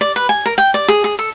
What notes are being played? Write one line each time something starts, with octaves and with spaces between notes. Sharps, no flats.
D5
B4
G#5
A#4
G5
D5
G#4
G#4
A4